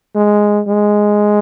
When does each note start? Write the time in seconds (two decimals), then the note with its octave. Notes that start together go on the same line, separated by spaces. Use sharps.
0.15 G#3
0.67 G#3